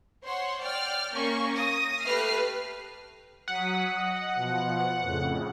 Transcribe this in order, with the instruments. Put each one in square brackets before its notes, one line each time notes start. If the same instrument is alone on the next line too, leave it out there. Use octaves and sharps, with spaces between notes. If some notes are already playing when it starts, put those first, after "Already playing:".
[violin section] C5 C#5 F#5 C6
D5 G5 F6
A#3 C#4 C#6
D#6 A#6
A3 G4 B4 F6 C7
[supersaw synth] F#3 D#6 B6 [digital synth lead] F#5
[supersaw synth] D#5
B2 F3
F2 A2 C#3